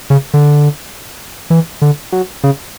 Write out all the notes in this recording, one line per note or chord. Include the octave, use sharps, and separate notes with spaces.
C#3
D3
E3
D3
F#3
C#3